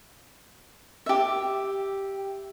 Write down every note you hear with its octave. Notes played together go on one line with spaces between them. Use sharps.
G4 E5